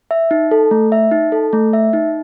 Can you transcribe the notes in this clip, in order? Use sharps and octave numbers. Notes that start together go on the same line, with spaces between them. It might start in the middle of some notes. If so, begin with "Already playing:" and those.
E5
D#4
A4
A3
E5
D#4
A4
A3
E5
D#4